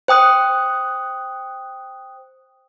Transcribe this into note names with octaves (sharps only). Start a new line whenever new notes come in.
C5 G5 D#6 F#6